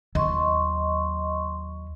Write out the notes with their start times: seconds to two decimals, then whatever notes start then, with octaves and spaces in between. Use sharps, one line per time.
0.15 D#2 F#3 D#5 C6 C#6